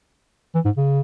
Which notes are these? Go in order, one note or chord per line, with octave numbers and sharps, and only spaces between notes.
E3
G#2
C#3